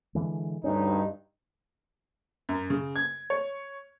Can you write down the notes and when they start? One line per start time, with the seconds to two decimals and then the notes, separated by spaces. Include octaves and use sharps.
0.15 D3 E3 G#3
0.64 D2 G2 C#4 D#4
2.49 F#2
2.70 C#3
2.96 G#6
3.30 C#5